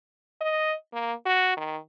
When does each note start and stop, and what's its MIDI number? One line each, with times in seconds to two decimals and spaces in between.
0.41 0.74 75
0.93 1.13 58
1.26 1.56 66
1.57 1.77 51